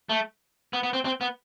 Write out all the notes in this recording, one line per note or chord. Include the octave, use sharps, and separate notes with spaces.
A3
B3
B3
C4
C4
B3